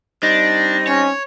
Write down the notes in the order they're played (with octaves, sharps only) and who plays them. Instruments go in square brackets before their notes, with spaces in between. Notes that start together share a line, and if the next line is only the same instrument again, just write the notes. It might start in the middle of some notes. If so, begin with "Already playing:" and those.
[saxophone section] G3 C4 D#4 [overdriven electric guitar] D4 [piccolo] A#6
[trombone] C#4 [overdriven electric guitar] C#5